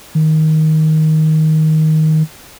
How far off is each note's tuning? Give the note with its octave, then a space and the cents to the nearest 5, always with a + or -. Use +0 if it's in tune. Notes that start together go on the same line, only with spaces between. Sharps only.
D#3 +10